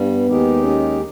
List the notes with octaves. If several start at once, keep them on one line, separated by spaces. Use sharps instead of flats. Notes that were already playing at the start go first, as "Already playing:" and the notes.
Already playing: G2 G3 B3
D#2 D#3 G#3 D#4 G4
C#4